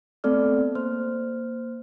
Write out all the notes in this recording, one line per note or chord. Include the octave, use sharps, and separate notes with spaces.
A3 B3 C4 A4 D5 F6
A#3 C5 C6 F6